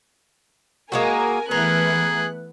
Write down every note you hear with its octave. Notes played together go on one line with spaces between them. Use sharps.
G#3 A#3 F#4 A#4 G#5
E3 A3 B3 E4 G#4 A#4 F#6